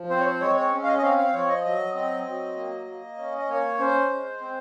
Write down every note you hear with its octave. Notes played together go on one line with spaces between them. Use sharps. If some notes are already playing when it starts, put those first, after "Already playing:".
Already playing: F3
C4 C5
C#5
C5
G#3 C#5
C#5
C#4
F5
D#5
D#5
C4 F5
F5
F3 C#5
D#5
F#3 D#5
C4 D#5
F#3
A#3
A#3
C#4
D#5
A#3 C#5
C#4 C5
G#3
C4